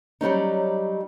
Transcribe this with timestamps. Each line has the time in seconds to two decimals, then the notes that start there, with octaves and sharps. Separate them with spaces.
0.21 F#3 G3 C#4 D#4